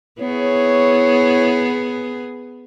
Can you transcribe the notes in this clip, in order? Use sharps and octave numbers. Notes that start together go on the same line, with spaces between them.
B3 E4 G#4 C#5